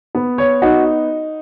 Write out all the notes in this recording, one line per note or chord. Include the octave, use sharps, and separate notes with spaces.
B3
C#5
D#4 F#4